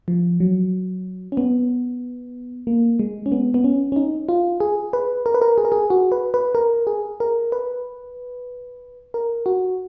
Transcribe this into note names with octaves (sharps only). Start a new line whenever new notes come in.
F3
F#3
C#4
B3
A#3
G#3
C#4
B3
B3
C#4
C#4
D#4
F4
G#4
B4
A#4
B4
A#4
G#4
A#4
G#4
F#4
B4
B4
A#4
G#4
A#4
B4
A#4
F#4